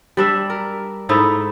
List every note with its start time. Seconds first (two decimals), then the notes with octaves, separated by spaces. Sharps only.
0.17 G3 D4 E5
0.50 A#4
1.09 G#2 A3 D#4 E4